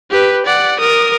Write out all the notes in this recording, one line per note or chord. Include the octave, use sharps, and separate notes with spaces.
G4 B4
D5 F#5
A#4 D#6